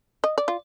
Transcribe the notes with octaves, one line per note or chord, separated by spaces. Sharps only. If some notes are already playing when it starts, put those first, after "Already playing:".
D#5
D5
F4